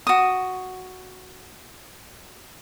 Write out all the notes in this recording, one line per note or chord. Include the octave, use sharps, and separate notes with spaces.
F#4 D#6